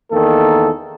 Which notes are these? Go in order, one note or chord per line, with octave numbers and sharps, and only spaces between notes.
E2 D#3 A#3 A4